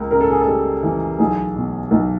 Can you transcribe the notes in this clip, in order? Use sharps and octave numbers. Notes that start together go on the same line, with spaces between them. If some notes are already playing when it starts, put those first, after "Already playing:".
Already playing: C#2 A#4
C#3 A#4
A4
G#4
A4
G3
E3
B1 G#4
B2
B1